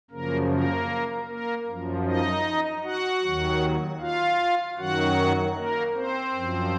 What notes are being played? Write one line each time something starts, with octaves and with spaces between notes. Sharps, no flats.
F#2 C#3 F3 A#3 A#4
A#3 A#4
A#3 A#4
F#2 F3
D#4 D#5
F#4 F#5
D#2 D#3 F#3
F4 F5
F#2 D#3 F#3 F#4 F#5
A#3 A#4
C4 C5
F#2 F3